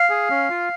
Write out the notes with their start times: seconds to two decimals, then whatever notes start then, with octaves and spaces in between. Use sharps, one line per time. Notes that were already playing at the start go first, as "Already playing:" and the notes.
Already playing: F5
0.10 G#4
0.30 C#4
0.50 F4